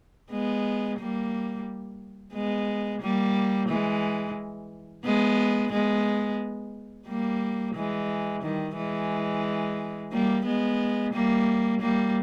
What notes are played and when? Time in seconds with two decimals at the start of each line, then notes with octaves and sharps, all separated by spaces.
0.30 G#3 B3
0.99 G3 A#3
2.34 G#3 B3
3.01 G3 A#3
3.69 E3 G#3
5.04 G#3 B3
5.72 G#3 B3
7.07 G3 A#3
7.75 E3 G#3
8.43 D#3 G3
8.76 E3 G#3
10.12 G3 A#3
10.45 G#3 B3
11.13 G3 A#3
11.80 G3 A#3